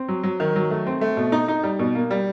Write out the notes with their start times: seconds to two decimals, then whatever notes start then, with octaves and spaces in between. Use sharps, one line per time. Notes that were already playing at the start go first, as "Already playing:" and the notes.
Already playing: C4
0.08 F#3
0.23 F#3
0.40 D#3
0.56 F#3
0.70 A3
0.87 C4
1.01 A3
1.17 B2
1.32 D#4
1.48 D#4
1.63 G3
1.79 B2
1.95 A#3
2.11 G3